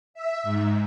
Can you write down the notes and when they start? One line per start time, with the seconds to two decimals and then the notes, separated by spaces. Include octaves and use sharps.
0.14 E5
0.43 G#2